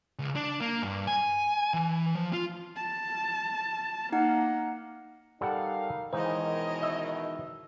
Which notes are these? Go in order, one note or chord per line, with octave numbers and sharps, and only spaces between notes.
C#2
D4
A#3
G2
G#5
E3
F3
F4
A5
A#3 D#4 F#5
G3 D#4 A4 A#4 F5 F#5
B2 D#3 E3 G#3 D#4 C5 C#5 D#5
E5 E6